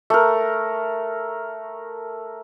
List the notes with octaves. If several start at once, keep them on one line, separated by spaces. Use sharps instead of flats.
A3 A#4